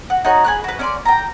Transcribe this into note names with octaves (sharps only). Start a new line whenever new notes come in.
F#4
D#4 F#4 B4 C#5
G#4 B5 F#6
F#4 B4
C#4 D5 C6
G5 A#5